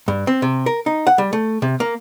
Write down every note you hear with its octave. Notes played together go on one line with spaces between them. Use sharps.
G2
C4
C3
A#4
D#4
F#5
G3
A3
C3
A#3